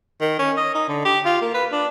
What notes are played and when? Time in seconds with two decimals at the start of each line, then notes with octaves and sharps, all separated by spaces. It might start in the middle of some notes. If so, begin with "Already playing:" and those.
0.21 D#3
0.39 C#4
0.57 D#5
0.75 D#4
0.89 D3
1.05 G4
1.25 F4
1.42 A#3
1.54 B4
1.72 D4